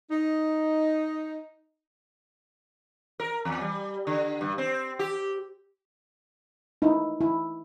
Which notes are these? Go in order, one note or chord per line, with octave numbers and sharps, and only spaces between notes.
D#4
A#4
E2
G3
D3
G2
C4
G4
D#4 E4
E4